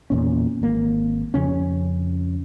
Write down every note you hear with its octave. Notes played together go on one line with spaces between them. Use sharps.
E2 A#2 C#4
G#1 A#3
F2 C#3 C#4